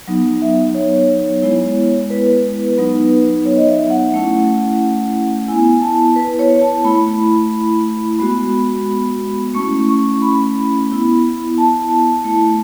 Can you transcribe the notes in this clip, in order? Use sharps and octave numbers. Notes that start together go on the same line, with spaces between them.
F#3 B3 D#4
E5
C#5
G#3 B3 E4
B4
F#3 B3 D#4
C#5
D#5
E5
F#5
A3 C#4 E4
B3 E4 G#5
A5
B4
C#5
A5
A3 E4 B5
G#3 B3 F#4 B5
A3 C#4 E4 C#6
C#6
B5
B3 E4
A5
A3 E4